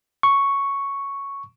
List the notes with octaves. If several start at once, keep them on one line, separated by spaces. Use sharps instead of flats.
C#6